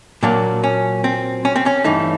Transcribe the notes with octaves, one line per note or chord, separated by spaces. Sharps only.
A#2 F#3 A#3 D4
C#4
C4
C#4
C4
C#4
G2 E3 A3 D#4